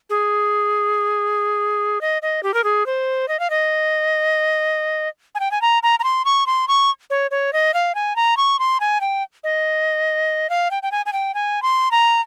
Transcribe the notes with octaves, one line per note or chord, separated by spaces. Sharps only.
G#4
D#5
D#5
G4
A#4
G#4
C5
D#5
F5
D#5
G#5
G5
G#5
A#5
A#5
A#5
C6
C#6
C6
C#6
C#5
C#5
D#5
F5
G#5
A#5
C#6
C6
G#5
G5
D#5
F5
G5
G5
G#5
G#5
G5
G#5
C6
A#5